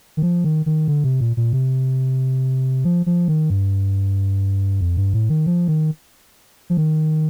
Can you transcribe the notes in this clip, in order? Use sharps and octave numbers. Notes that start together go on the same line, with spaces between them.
D#3
F3
D#3
D#3
D3
C3
A#2
A#2
C3
F3
F3
D#3
G2
F2
G2
A2
D#3
F3
D#3
F3
D#3